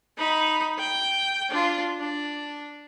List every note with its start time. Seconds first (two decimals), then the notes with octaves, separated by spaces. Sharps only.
0.18 D#4 B5
0.78 G5
1.50 D4 F4
2.00 D4